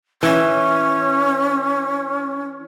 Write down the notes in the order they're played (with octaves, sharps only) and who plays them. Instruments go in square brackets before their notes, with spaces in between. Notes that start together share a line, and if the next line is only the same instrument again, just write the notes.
[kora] E3 [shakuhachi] C#4